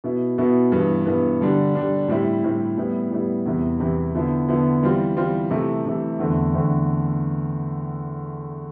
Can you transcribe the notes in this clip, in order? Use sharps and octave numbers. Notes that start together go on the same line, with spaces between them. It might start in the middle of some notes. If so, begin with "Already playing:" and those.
B2 B3 E4
B2 B3 E4
G2 E3 B3
G2 E3 B3
D3 G3 D4
D3 G3 D4
A2 G3 C4 E4
A2 G3 C4 E4
A2 G3 B3 E4
A2 G3 B3 E4
E2 C3 E3 B3 E4
E2 C3 E3 B3 E4
D3 F3 B3 E4
D3 F3 B3 E4
E3 G3 C4 F4
E3 G3 C4 F4
C3 E3 A3
C3 E3 A3
E2 D3 A3 C4
E2 D3 A3 C4